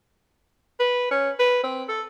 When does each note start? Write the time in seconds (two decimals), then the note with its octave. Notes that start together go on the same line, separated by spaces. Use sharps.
0.80 B4
1.11 C#4
1.39 B4
1.63 C4
1.89 A4